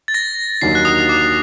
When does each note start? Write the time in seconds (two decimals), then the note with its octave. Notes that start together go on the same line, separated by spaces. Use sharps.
0.08 A6
0.14 A#6
0.61 D#2 D3 F#3 A#3 D#4 C7
0.75 F#6
0.85 D#6
1.09 D6